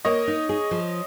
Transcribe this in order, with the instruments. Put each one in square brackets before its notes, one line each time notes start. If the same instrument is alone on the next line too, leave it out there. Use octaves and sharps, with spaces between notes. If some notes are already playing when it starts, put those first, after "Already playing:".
[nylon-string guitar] A#3 [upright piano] C#5 D#5
[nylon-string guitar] D#4
G#4
F3